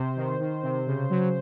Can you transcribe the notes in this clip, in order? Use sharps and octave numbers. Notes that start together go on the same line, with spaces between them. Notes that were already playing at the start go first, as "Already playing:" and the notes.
Already playing: C3 C5
D#3
D#3
C3
C#3
F#3